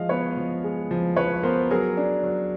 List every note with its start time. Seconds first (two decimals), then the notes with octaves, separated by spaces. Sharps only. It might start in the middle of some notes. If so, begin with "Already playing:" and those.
Already playing: F3 G#3 D#5 F5
0.09 B3 B4 C#5
0.37 F3
0.64 G#3
0.91 F3
1.17 F3 B4 C#5
1.43 B3 A#4 C5
1.71 F#3 G#4 A#4
1.97 D4
2.23 F#3